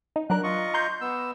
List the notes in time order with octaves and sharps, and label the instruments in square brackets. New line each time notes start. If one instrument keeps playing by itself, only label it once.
[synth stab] D#4
[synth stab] F#3 D4 A#4 [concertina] F#6
[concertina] F4 D#5 C#6
[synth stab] A#5 C6 G6
[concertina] B3 E6